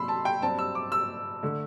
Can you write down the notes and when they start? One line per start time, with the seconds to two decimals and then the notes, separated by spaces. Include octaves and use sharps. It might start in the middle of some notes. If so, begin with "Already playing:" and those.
Already playing: C3 F#3 B5 C6 E6
0.08 A5
0.25 G5
0.42 G2 F#3 C4 A5
0.59 E6
0.75 D6
0.92 E6
1.43 D3 A3